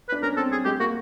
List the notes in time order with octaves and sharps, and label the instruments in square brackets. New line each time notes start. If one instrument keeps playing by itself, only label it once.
[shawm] B4
[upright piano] D4
[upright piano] C#4 [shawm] A#4
[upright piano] C4 [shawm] A4
[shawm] G#4
[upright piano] G#3 [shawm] G4
[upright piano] A#3 [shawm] F#4